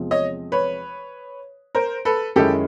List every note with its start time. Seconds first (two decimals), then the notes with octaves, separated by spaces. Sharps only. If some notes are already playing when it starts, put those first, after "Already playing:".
Already playing: E2 C3 F3 G#3 C4
0.11 C#5 D#5
0.52 B4 C#5
1.75 A#4 C5
2.05 A4 B4
2.36 F#2 D#3 G#3 C#4 E4 G4 A4